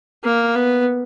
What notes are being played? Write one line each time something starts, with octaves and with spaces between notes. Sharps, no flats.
A#3
B3